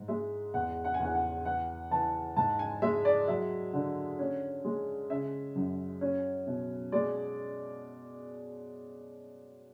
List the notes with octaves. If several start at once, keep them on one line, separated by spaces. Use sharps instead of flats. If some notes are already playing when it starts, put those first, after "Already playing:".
Already playing: G#2
G#3 E5
E2 F#5
F#5
G#5
E2 F#5
F#5
E3 F#5
E3 A5
G#2 A5
G#5
G#3 E5
D5
F#3 E5
D3
C#4
G#3
C#3 E5
F#2
C#4
B2
G#3 D5